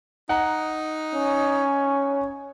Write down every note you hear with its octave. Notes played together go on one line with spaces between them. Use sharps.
D#4 F#5 A#5
C#4